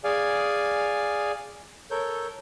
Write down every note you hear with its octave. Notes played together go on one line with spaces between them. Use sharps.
G#4 D5 F5 G#5
A4 A#4 C#5 G6